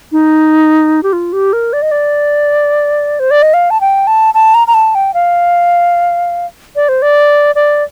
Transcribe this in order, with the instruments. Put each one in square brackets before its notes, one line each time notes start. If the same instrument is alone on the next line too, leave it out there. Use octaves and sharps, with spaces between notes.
[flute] D#4
G4
F4
G4
A#4
D5
D#5
D5
C5
D5
D#5
F5
A5
G5
A5
A5
A#5
A#5
A5
G5
F5
D5
C5
D5
D5